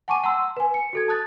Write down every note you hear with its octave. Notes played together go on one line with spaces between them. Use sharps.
F#5 G#5 A5 C#6 D6 D#7
F#5 A5 A#5 C6 E6
B4 G#5
C#7
F#4 A4 G#6
A5 D#6 F#6 A6